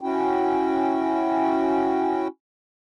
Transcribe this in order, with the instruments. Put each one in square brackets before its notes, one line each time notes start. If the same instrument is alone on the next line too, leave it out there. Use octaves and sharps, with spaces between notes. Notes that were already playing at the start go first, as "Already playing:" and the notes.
[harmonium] C#4 E4 F#4 G5